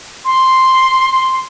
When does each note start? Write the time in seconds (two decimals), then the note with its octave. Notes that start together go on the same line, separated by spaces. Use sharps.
0.25 C6